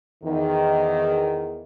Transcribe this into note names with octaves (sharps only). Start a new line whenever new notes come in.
E2 D#3